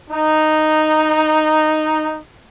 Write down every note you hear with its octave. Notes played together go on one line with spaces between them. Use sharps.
D#4